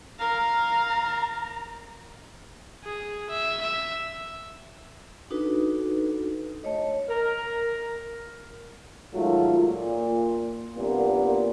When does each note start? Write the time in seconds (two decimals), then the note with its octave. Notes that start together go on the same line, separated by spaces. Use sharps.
0.19 A#4 F5 A#5
2.84 G#4
3.30 E5
3.62 E5
5.30 D4 D#4 F#4 A4 B4
6.64 A3 C#5 D#5
7.09 A#4
9.14 G#2 D#3 F#3 A3 F4
9.65 A#2
10.77 C2 G2 A#2 A#3 B3